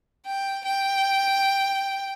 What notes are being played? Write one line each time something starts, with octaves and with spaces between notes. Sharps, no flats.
G5
G5